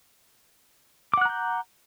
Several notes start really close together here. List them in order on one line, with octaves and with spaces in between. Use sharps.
D6 F#5 F#6 A#5 G6